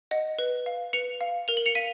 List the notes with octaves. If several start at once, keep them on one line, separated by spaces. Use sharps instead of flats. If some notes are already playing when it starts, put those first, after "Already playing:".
D#5 F#5
B4
F5
B4 C#7 F7
F5
A#4 F7
F#7
C#7 F7
F5 B6 D#7